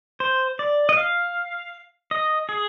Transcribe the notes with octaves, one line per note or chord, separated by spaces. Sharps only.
C5
D5
D#5
F5
D#5
G#4